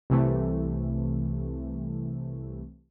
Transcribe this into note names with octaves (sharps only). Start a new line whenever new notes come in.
C2 C3 E3 A3